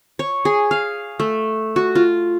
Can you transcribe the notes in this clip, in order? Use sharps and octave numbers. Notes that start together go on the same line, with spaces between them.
C#5
G#4
F5
A3
F#4
F4